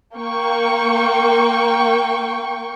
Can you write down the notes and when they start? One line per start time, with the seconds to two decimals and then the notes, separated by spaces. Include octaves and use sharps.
0.16 A#3 G5 C#6